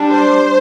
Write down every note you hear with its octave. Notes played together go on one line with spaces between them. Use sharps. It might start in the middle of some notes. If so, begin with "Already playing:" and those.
Already playing: G3 D4
C5